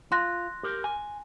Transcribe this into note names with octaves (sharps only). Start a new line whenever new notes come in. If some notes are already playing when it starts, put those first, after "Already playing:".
F4 C6 F#6 A#6
G4 A#4
G#5